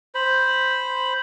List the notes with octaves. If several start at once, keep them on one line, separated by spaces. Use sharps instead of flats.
C5 B5